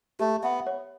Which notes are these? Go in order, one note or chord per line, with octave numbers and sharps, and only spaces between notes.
A3 G4
B3 E5
C#5